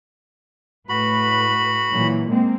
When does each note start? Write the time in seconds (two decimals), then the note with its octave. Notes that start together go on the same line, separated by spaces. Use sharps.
0.89 A2 F#4 B4 B5
1.91 A#2 E3 F#3
2.28 G#3 A#3 C4